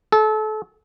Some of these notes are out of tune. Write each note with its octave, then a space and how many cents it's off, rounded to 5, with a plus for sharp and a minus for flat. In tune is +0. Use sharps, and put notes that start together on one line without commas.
A4 -30